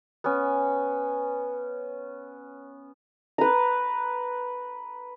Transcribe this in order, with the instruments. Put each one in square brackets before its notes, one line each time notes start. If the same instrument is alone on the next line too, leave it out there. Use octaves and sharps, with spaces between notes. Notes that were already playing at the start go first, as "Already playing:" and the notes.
[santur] B3 C#4
B4 A#5